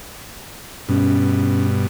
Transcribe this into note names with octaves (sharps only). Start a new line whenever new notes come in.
G2 B2 C#4